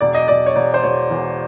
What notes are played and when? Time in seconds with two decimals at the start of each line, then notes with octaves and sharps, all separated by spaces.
0.01 E1 D5
0.15 D#5
0.28 E1 D5
0.46 C#5
0.56 E1 D5
0.74 C5
0.84 E1 C#5
1.11 E2